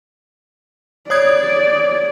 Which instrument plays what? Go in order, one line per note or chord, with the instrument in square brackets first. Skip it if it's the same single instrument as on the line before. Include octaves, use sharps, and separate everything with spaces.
[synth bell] C#5 D#6 G#6 [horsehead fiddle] D5